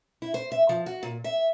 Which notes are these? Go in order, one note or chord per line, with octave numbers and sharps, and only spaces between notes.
E4
C5
E5
F3
F#4
A#2
E5